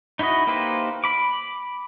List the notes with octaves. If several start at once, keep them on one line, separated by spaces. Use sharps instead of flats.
D#4 E4 F#4 B4 D#5
A#3 D#4 G4 B4 C5
B5 D6